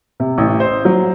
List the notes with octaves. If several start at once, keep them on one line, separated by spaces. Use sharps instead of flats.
C3
A1
C5
F#3